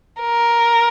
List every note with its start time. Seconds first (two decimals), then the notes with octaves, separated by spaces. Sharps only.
0.21 A#4